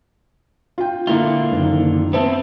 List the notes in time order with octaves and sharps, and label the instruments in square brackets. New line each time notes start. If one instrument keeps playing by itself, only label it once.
[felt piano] F4 G5
[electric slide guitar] D3 A#3 F4 [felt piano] E4
[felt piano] F#1 D#3
[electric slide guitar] B3 C4 [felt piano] C5 E5 A5